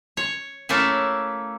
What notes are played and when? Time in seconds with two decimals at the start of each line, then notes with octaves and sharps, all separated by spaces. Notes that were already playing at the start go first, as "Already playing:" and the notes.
0.17 C#5
0.69 A3 A#3 C#4 E4